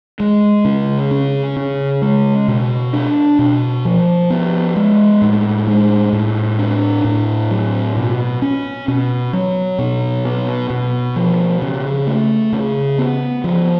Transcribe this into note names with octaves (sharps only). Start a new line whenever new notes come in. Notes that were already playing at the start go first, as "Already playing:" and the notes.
G#3
C#3
C#4
C#3
G#3
B2
D4
B2
F3
B3
G#3
A2
G#3
A2
D4
A2
F#3
B2
C#4
B2
F#3
B2
B3
B2
F3
C#3
A3
C#3
B3
F3